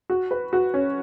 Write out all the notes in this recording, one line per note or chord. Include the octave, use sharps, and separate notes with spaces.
F#4
B4
F#4
C#4